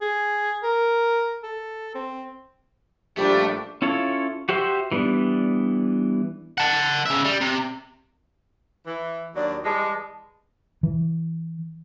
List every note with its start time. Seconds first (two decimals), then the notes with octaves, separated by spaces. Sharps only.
0.01 G#4
0.63 A#4
1.43 A4
1.95 C4
3.17 A#1 F3 G3 A3 D4 G4 D6
3.82 C#4 E4 F4 A4 C#5
4.49 F#4 G4 C5 E5 C6
4.92 E3 G3 B3 D4
6.58 F#5 A5
7.06 C#3 E5
7.25 G3
7.41 C3
8.87 E3
9.36 D#2 F#3 D4 D5
9.65 E3 G3 G#3 A5
10.83 E3